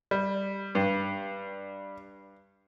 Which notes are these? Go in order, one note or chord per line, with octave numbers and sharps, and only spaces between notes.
G3
G2